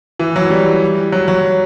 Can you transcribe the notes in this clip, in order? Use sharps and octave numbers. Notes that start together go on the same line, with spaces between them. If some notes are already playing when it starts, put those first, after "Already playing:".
E3
F#3
G3
F#3
F#3